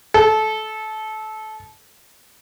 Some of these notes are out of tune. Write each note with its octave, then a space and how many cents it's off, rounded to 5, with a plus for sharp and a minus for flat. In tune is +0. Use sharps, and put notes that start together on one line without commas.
A4 -20